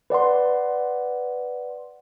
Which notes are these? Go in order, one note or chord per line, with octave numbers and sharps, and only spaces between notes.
B4 D5 F#5 C6